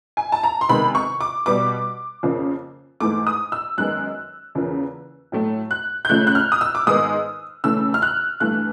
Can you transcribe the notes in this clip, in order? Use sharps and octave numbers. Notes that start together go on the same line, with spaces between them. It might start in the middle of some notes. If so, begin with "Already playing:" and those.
G#5
A5
A#5
C6
C3 D#3 G#3 B3 B5
C#6
D6
B2 G3 B3 D6
F2 C#3 F3 A#3
G#2 E3 A3 D6
D#6
E6
F#2 D#3 G#3 B3 F#6
E2 C#3 F3 A#3
A2 F#3 A3
F#6
G6
C#3 F3 A3 F#6
F#6
F6
D#6
E6
D6
G#2 D#3 G#3 B3 D#6
C#3 E3 A3 E6
F6
F#6
G2 E3 A3 F#6